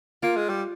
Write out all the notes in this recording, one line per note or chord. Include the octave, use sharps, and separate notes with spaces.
A#3 F4
G#3
G3